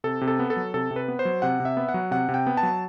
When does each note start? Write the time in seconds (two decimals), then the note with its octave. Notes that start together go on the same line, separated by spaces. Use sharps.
0.04 C3 A4
0.21 C3
0.28 A4
0.39 B3
0.50 A4
0.57 F#3
0.74 C3 A4
0.91 C3
0.96 B4
1.08 B3
1.19 C5
1.25 F#3
1.42 C3 F#5
1.60 C3
1.65 E5
1.77 B3
1.89 F#5
1.94 F#3
2.11 C3 F#5
2.29 C3
2.34 G5
2.47 B3
2.57 A5
2.63 F#3